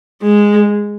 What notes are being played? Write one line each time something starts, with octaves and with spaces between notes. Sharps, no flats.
G#3